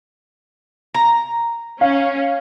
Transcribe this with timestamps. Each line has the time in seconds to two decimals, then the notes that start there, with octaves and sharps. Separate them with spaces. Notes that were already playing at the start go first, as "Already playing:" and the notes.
0.94 A#5
1.81 C#4 F5